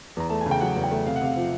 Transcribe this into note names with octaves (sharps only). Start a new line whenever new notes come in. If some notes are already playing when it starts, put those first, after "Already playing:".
E2 A#5
A3 A5
C#3 G#5
G5
F#3 F#5
E2
G5
A3
C3 F5
F#5
C3 F5
F3